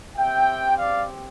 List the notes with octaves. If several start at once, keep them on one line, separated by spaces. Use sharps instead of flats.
C4 G4 E5 G5
D5 F5